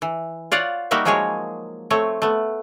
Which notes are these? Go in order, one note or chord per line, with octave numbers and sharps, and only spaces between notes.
E3
F4 C#5 D5 F5 F#5
G3 A#3 D#4 F#4 A#4 E5
F3 F#3 G#3 G#4 A#4 C#5
A3 C4 C#5
A3 B3